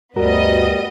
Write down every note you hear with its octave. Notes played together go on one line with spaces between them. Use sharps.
D2 G2 G3 B3 F#4 A#4 D#5